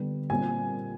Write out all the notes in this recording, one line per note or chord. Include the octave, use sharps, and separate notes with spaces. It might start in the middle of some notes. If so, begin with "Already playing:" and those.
Already playing: D3 G3 B3 D4
A#2 G3 C4 G#5